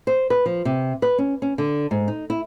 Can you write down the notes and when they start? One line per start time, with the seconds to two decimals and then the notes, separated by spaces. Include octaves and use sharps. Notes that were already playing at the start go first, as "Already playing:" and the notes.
0.07 C5
0.30 B4
0.46 F3
0.65 C3
1.02 B4
1.18 C#4
1.42 C#4
1.58 D3
1.91 G#2
2.08 D#4
2.30 E4